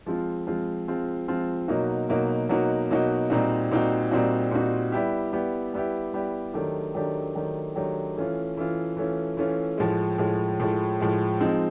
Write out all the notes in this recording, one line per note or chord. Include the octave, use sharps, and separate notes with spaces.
F3 G#3 C4 F4
F3 G#3 C4 F4
F3 G#3 C4 F4
F3 G#3 C4 F4
B2 F#3 A#3 D#4 F#4
B2 F#3 A#3 D#4 F#4
B2 F#3 A#3 D#4 F#4
B2 F#3 A#3 D#4 F#4
A#2 G3 C4 D#4 F#4
A#2 G3 C4 D#4 F#4
A#2 G3 C4 D#4 F#4
A#2 G3 C4 D#4 F#4
G3 B3 E4 G4
G3 B3 E4 G4
G3 B3 E4 G4
G3 B3 E4 G4
D#3 F#3 A3 D4 G4
D#3 F#3 A3 D4 G4
D#3 F#3 A3 D4 G4
D#3 F#3 A3 D4 G4
E3 A3 C#4 F4
E3 A3 C#4 F4
E3 A3 C#4 F4
E3 A3 C#4 F4
A2 F3 G#3
A2 F3 G#3
A2 F3 G#3
A2 F3 G#3
F3 G#3 C4 D#4